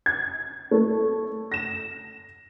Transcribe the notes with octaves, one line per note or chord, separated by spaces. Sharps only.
G#6
A3
A#6 E7